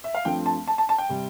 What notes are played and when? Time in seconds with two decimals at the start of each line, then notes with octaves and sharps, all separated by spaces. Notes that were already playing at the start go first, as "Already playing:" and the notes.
0.04 E5
0.14 F5
0.25 G2 F3 A3 C4 G5
0.46 A5
0.68 A5
0.78 A5
0.89 A5
0.98 G5
1.09 C3 G3